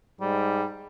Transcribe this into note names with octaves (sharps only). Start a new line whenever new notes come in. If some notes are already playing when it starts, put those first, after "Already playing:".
G#2 G3